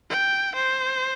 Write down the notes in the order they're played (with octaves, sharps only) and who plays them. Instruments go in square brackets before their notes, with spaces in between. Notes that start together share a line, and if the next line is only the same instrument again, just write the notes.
[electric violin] G5
C5